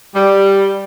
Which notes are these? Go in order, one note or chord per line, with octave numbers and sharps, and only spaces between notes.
G3